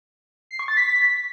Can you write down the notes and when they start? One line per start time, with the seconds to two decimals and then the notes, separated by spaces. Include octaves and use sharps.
0.51 C7
0.59 C#6
0.68 A6
0.77 B6